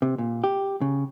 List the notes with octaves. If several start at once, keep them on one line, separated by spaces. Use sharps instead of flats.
C3
A#2
G4
C#3